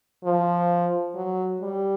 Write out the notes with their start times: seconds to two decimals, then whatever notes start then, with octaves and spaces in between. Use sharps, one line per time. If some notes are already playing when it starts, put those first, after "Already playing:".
0.24 F3
1.15 F#3
1.61 G3